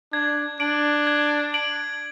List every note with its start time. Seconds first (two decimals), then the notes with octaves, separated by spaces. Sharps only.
0.12 D4 G#6
0.60 D4 D7 F#7
1.07 G#6
1.54 D7 F#7